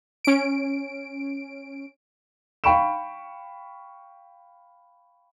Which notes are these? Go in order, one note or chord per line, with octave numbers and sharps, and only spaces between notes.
C#4 D7
F5 G5 B5 C#6 D7 E7